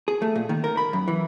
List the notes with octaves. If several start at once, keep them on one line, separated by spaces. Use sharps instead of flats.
G#4
A3
A#2
D#3
A#4
B5
F#2
E3